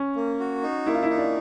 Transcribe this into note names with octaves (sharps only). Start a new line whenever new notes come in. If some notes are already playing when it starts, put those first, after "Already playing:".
Already playing: C#4
A#3
F#4
D#4
A#3 E4
F4
E4
D#4
D4